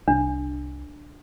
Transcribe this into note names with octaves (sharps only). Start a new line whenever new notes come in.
C2 D4